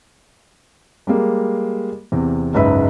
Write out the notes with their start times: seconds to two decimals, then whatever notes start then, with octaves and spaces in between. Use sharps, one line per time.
1.07 G3 G#3 A#3
2.12 E2 C3
2.54 F#1 C#2 G#2 B4 E5 B5